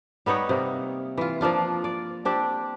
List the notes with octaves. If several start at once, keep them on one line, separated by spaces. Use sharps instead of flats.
G3 B3 D#4 C#5
C3 A#3
E3 F4
F3 A#3 D4 F4
D5
C4 D4 G4